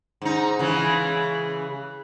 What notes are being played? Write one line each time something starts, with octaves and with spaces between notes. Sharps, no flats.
G#2 D#4
C#3 E3 G#3